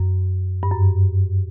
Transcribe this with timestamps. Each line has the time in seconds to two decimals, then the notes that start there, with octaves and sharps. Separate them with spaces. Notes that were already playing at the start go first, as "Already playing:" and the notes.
Already playing: F#2
0.63 G2
0.71 F#2